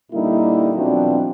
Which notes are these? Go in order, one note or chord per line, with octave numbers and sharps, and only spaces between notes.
A#2 D3 G3 A#3 D#4 E4
B2 E3 F#3 C4 D4 F4